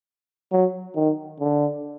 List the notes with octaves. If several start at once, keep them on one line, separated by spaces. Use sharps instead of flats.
F#3
D#3
D3